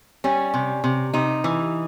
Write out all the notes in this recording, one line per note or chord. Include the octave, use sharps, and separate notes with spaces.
G3 C#4
C3
C3
C3 D#4
E3